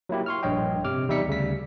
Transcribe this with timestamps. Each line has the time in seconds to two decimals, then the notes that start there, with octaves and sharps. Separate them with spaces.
0.09 F#3 A#3 E4 G4
0.26 C6 C#6 F6
0.43 A#1 G2 C#5 D#5 G5
0.84 C3 D6 F6
1.08 E2 G3 D#4 E5 B6 C#7
1.27 D2 C#3 G3 B6